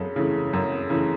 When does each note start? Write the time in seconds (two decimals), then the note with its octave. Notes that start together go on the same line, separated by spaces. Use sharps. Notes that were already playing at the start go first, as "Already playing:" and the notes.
Already playing: F#2 C#3 A4
0.16 C#3 E3 A3
0.53 F#2
0.90 C#3 E3 A3